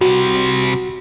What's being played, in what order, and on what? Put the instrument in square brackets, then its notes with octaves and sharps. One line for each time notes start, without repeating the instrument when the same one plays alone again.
[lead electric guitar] C3 G3 [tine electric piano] F#4